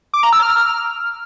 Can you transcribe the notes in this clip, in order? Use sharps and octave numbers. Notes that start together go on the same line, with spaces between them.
D6
A#5
E6
F6